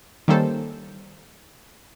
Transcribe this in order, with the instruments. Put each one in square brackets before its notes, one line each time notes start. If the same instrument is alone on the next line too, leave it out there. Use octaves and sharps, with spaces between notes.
[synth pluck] D#3 G3 A#3 C#4 A4 C5